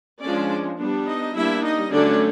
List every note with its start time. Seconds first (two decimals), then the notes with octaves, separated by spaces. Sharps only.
0.21 F3 G#3 C#4 D4 D5
0.78 G3 B3 D4
1.05 D#4 D#5
1.34 G3 A#3 D4 E4 E5
1.62 D#4 D#5
1.90 D3 F#3 A3 C#4 D4 D5